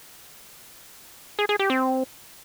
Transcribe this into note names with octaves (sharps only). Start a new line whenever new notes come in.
G#4
G#4
G4
C4